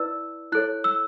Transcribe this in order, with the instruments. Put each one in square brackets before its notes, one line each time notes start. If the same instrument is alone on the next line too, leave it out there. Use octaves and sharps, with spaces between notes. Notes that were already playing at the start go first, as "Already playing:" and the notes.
Already playing: [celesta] E4 B4 D5 E6
E4 A4 C#5 F#6
E6